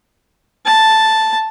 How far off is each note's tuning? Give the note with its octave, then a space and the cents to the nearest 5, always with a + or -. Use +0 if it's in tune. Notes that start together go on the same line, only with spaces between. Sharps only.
A5 +0